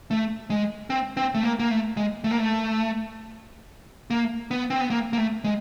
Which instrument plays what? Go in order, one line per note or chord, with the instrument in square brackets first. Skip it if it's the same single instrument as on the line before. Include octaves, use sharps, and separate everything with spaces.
[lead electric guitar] A3
G#3
C4
C4
A3
A#3
A#3
A3
G#3
A3
A#3
A3
A#3
B3
C4
B3
A#3
A#3
A3
G#3